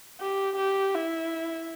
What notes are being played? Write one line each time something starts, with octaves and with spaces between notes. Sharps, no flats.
G4
G4
E4